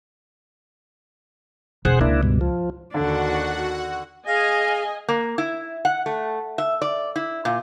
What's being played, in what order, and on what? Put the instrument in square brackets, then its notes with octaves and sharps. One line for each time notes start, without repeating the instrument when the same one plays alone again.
[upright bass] E1 [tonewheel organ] G#4 C5 F#5
[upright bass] C#2 [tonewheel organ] A#3 D4 E4
[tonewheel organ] G2 B2
F3
[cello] D#2 D4 [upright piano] D3 [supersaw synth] F#4 F#5
[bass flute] G#4 [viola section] D#5 G#5 [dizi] F5 [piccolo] A#6
[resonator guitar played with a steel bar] A#3
E4
F#5
A3
E5
D5
E4
A#2